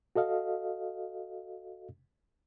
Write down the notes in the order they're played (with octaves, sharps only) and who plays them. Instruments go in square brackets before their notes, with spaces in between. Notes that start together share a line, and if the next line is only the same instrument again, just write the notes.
[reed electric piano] F#4 A4 D#5 F5